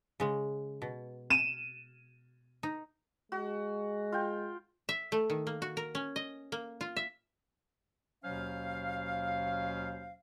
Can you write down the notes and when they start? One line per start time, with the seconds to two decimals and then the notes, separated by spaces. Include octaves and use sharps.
0.20 C#3 G#3
0.82 B2
1.30 D#7 E7
2.63 D#4
3.32 G#3 F#4
4.12 F4 G5
4.89 E5
5.12 A3
5.30 D#3
5.47 A#3
5.62 F#4
5.77 A#4
5.95 C#4
6.16 D#5
6.52 A#3
6.81 F4
6.97 E5
8.24 D#2 B2 F#3 C#4 C5 F5